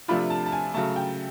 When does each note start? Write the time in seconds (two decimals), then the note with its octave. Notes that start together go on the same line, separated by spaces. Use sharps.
0.08 C3 F3 A3 D4 F4 B5
0.30 A5
0.46 A5
0.52 G#5
0.74 C#3 F#3 A3 A5
0.96 G5